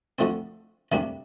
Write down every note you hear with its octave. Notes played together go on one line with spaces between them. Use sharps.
D2 D3 F3 A3 C4
D2 C3 G3 A#3 D4